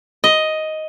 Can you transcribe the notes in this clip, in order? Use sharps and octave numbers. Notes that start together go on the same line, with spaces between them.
D#5